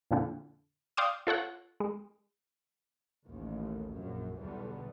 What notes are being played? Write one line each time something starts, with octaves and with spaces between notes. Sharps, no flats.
F2 A#2 D3
D5 F5 G5 C6 D6 D#6
F4 A4 C#5 F#5
G#3
A1 D#2
A#1 F#2
B1 E2 B2 D3 G3 B3